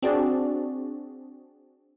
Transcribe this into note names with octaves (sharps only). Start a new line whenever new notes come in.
C4 D4 F#4 G#4 D5